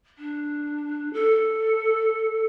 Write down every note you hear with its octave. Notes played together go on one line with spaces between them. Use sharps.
D4
A4